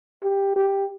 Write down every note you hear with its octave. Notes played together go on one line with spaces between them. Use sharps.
G4
G4